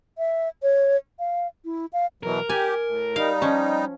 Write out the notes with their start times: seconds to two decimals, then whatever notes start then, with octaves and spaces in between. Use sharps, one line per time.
0.18 E5
0.62 C#5
1.19 F5
1.65 E4
1.93 F5
2.23 B2 E3 F#3 A#4
2.49 G4 D5 G#5
2.87 A2
3.16 G3 D#4 F5
3.42 F3 C#4